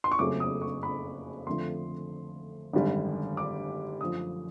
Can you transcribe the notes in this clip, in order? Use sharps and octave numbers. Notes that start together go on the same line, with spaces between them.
C6
C#6
F#1 F2 C#3 F#3 A3 D6
D#6
C#6
B5
F2 D3 F3 A3 C6
G#1 F#2 D3 G3
D6
F#2 D3 F3 A3 D#6